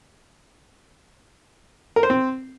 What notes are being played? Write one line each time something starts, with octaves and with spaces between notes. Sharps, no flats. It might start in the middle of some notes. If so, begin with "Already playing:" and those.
A#4
C5
C4